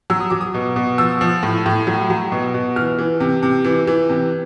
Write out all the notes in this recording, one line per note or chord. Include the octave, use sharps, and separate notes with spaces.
F#3 E6
D#6
F#3 D6
D#6
B2
B2
F3 E6
F3
A2
A2
F#3
F#3
B2
B2
E3 F6
E3
C3
C3
E3
E3
C3